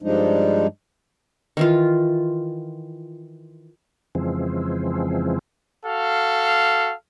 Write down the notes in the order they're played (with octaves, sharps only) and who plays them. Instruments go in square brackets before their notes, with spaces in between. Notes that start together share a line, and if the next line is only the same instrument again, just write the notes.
[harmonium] G2 F3 G3 G#3 D4 D#4
[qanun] D#3 E3 F4
[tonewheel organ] F2 C#3 E3 F3 G#3 C4
[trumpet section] F#4 A4 F5